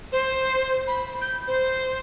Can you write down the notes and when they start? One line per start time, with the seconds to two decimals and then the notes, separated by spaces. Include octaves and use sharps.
0.12 C5
0.87 B5
1.21 G6
1.47 C5